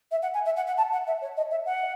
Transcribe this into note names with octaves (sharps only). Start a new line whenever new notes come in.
E5
F#5
G#5
E5
F#5
F#5
A5
F#5
E5
C#5
D#5
E5
F#5